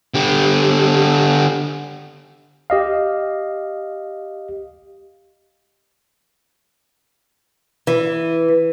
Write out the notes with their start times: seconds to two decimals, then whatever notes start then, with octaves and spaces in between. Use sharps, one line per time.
0.14 D3 G4
2.70 G4 D#5 F5
7.87 E3